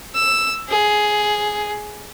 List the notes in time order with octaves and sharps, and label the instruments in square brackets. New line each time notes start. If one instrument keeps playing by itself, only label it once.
[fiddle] E6
G#4